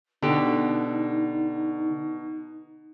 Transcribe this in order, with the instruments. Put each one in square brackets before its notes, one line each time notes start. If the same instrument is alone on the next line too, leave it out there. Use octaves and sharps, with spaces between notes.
[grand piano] B2 [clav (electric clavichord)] D3 G4 [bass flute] D#4